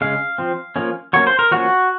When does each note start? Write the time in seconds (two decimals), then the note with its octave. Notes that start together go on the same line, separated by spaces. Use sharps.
0.01 C#3 G#3 C#4 F5
0.38 F3 C4
0.76 F3 A#3 C#4
1.13 F#3 A#3 C#4 C#5
1.27 C5
1.39 A#4
1.51 F3 A#3 C#4 F#4